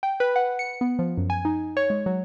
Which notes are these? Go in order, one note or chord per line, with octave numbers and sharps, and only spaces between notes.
G5
B4
F#5
C#7
B3
F3
F#2
G#5
D#4
C#5
G#3
F#3